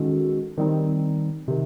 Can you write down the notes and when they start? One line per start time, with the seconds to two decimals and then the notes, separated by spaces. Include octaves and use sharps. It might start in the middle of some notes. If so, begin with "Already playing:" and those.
Already playing: D#3 G#3 C#4 F#4 A4
0.58 D#3 G3 C4 D#4
1.48 C3 D#3